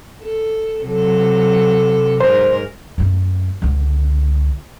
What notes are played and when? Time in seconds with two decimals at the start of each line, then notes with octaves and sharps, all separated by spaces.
0.21 A4
0.83 C3 F#3 A4
2.20 G#2 A#4 C5
2.98 F#2 A3
3.62 C#2 D3